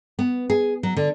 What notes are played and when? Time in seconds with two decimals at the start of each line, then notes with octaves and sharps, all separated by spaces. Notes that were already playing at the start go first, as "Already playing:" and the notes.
0.19 B3
0.50 G#4
0.83 F#3
0.96 D3